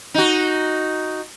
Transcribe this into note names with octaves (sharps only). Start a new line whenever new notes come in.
D#4 F#4